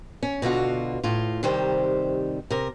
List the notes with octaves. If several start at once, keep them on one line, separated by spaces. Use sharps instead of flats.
C#4
B2 D3 F4 F#4
A2 F4
C3 D#3 G3 C5
C3 A#4